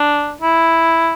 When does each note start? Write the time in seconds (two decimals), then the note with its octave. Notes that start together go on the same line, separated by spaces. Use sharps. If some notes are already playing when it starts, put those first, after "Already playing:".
Already playing: D4
0.42 E4